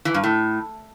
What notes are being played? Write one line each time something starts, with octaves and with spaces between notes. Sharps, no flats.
E3
G2
A2